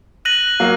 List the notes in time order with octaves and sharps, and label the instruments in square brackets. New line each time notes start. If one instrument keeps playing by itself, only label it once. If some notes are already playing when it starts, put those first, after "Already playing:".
[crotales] F#6 A#6 D#7 F#7
[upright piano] F#3 A#3